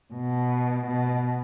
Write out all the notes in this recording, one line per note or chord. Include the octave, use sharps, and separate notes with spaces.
B2
B2